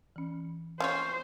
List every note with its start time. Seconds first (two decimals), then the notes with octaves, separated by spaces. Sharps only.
0.16 E3 C#4
0.80 C#4 F4 C5 C#5 F5 C6